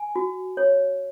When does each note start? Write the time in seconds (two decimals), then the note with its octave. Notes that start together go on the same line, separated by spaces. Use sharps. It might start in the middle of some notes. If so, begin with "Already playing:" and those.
Already playing: G#5
0.16 F#4
0.57 C#5